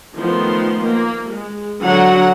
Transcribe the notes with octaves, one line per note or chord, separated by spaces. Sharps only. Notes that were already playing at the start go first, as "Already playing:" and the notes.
D#3 F3 A3 B3 C6
A#3
G#3
D3 F#3 F#4 F#5 A#5